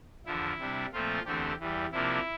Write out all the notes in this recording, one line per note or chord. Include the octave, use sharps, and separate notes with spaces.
E2 D3 F3 E4
C3 G3 D4
A#2 F3 A3 C4 F4
E2 D3 A3 C4 G4
E2 E3 G3
C3 F3 A#3 D4 E4